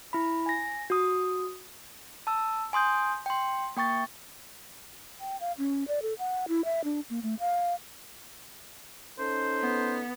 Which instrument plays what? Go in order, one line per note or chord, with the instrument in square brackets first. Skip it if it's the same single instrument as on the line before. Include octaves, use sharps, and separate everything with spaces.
[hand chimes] E4 B5
G#5 A#6
F#4 D#6
A5 E6
G#5 C6 D#6 G6
G5 C6
A#3 G5 C#6 A6
[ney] G5
F5
C#4
D5
A4
F#5
E4
E5
D4
A#3
A3
F5
[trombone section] C#4 D#4 A4 [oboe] C5
[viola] B3